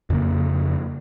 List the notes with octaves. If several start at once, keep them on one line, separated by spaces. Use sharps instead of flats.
F2 C#3 A#3